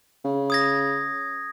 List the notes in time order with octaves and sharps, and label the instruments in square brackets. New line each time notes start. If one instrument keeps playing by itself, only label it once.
[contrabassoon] C#3
[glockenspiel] D#6 G#6 A#6